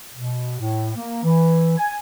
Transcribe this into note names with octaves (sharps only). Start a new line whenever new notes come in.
B2
A2
A#3
E3
G#5